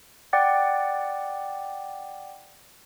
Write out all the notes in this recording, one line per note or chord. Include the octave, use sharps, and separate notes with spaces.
D5 F#5 G5 D6 A6